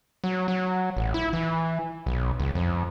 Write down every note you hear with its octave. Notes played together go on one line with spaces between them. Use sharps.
F#3
F#3
A1
E4
E3
B1
C#2
F2